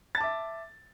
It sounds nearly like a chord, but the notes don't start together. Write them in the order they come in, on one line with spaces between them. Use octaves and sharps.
A6 A5 D6 E5